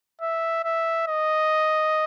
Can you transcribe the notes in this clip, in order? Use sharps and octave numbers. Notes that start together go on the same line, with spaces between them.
E5
E5
D#5